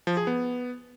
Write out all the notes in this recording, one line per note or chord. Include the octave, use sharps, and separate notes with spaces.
F3
G#4
B3